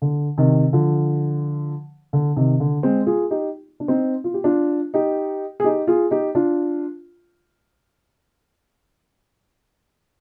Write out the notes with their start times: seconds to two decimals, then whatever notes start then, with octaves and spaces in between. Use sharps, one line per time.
0.02 D3
0.38 C3 D#3
0.73 D3 F3
2.13 D3
2.37 C3 D#3
2.60 D3
2.83 G#3 C4
3.07 F4 G#4
3.31 D#4 G4
3.80 D4
3.88 C4 D#4
4.24 F4
4.34 G4
4.44 D4 F4
4.94 D#4 G4
5.60 G#4
5.64 D#4 G4
5.87 F4 G#4
6.11 D#4 G4
6.35 D4 F4